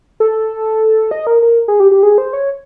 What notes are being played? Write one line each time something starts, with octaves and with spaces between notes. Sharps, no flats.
A4
D#5
A#4
A#4
G#4
G4
G4
G#4
C5
C#5